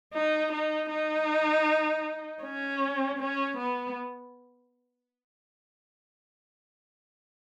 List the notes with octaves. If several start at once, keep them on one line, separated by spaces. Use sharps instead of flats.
D#4
D#4
D#4
C#4
C#4
B3